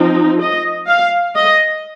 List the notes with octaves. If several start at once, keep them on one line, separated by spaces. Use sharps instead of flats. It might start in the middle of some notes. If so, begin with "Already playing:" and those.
Already playing: F3 C4 D#4
D#5
F5
D#5